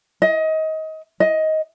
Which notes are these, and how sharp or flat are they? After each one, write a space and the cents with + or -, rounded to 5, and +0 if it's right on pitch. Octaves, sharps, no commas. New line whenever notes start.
D#5 +25
D#5 +15